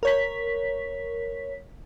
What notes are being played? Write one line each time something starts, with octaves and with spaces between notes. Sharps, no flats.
A#4 C#5 B6